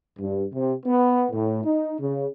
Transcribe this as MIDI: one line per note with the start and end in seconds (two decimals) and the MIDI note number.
0.20 0.45 43
0.53 0.74 48
0.86 1.27 59
1.32 1.61 45
1.64 1.93 63
1.99 2.26 49